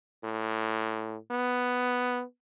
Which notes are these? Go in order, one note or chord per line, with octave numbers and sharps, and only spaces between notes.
A2
B3